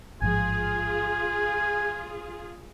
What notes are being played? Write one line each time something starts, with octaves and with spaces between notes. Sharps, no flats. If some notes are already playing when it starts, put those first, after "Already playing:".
A1 G#2 F3 F4 G#4 G#5